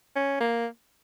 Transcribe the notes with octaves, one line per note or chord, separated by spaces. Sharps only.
C#4
A#3